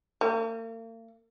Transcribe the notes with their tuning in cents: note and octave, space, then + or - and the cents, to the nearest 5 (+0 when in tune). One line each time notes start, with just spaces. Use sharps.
A#3 -45